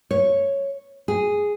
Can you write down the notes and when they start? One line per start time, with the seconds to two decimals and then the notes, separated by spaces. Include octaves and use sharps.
0.11 C#5
1.08 G#4